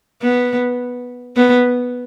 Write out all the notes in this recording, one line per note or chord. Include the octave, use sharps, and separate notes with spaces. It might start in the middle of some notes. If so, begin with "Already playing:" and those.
B3
B3